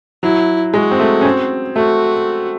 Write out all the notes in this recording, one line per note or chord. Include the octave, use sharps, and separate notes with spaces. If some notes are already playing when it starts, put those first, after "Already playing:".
F#3 E4
G#3 F#4
C4
A3
C#4
C4
A3 F#4